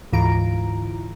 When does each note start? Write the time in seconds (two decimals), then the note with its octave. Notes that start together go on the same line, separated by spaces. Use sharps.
0.12 D2 G#2 E3 F4 A#5 D7